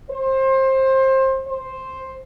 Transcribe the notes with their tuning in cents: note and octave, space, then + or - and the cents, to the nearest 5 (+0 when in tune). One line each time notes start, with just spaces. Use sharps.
C5 +25
C5 +5